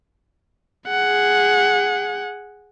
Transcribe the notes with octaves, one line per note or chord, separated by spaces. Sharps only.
G#4 F#5